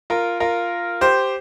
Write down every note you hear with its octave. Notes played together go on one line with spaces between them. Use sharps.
F4 A#4
F4 A#4
G4 C5